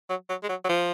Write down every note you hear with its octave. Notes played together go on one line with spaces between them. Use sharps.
F#3
F#3
G#3
F#3
F#3
F3